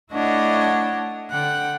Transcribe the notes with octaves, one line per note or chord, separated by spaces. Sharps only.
A3 D4 E4 C#5 D#5 F#5
D3 F#5 G5 F#6